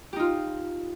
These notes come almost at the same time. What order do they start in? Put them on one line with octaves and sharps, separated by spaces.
G4 D#4 F4